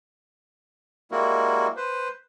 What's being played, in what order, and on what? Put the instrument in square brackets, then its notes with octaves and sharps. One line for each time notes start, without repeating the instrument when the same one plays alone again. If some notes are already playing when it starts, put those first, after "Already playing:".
[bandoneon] G3 G#3 A#3 E4 F#4 A#4
B4 C5